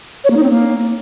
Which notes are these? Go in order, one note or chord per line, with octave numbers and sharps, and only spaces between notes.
C#5
A#3
D#4
C4
A#3